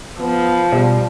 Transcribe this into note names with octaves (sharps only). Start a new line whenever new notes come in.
F3 B3
B2 G3